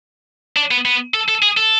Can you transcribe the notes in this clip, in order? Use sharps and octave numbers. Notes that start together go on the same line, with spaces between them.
D4
B3
B3
A4
A4
G#4
A4